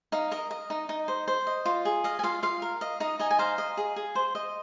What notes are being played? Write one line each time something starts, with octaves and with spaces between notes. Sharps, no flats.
D#4 F5
A#4 D#5
D#5
D#4
D#4
C5
C5
D#5
F4
G#4
D#5 F5
G#5
F4 F5
F4 F5
A#4
D#5 F5
D#4 D#5
D#4 D#5 G#5
G#5
C5 F5 A#5
D#5
G#4
G#4
C5
D#5